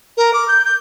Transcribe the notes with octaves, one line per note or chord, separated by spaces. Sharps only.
A#4
D6
G6
G6